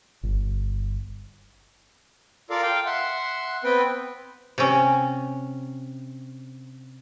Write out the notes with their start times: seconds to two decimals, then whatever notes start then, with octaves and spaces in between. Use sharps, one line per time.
0.23 G1
2.50 F4 A4 A#4 D5 F5
2.63 F5 G5
2.86 E5 F#5 C6
3.64 B3 C4 B4 G5
4.58 C3 C#4